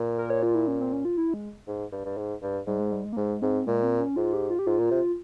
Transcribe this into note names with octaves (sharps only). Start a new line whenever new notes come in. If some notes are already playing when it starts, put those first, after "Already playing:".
Already playing: A#2
A#4
C#5
F4
E4
C#4
C4
C#4
F4
E4
G#3
G#2
G2
G2
G#2
G2
G#2 G3
G#3
G3
G#3
A#3
G#2 G#3
G#2 C4
A#2 G#3
C4
C#4
G#2 F4
G4
F4
G4
G#2 F4
A#2
C3